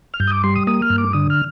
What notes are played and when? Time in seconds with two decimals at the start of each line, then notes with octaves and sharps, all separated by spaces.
0.14 F6
0.20 G2 G6
0.27 D#6
0.32 D6
0.44 G3 C6
0.56 D#6
0.67 A#3 D#6
0.82 F6
0.90 G2
0.98 D6
1.13 D3 D#6
1.30 F6